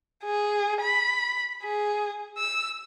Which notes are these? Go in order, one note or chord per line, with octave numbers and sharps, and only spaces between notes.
G#4
B5
G#4
E6